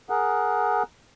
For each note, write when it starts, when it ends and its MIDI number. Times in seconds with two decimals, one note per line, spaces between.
0.10 0.83 68
0.10 0.83 70
0.10 0.83 78